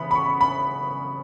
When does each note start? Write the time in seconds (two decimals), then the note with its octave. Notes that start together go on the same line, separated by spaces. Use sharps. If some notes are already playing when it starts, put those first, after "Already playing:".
Already playing: C#3 E3 B3 E4 B5
0.11 B5
0.15 C#6
0.41 B5